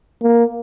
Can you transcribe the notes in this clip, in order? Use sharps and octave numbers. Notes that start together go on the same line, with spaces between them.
A#3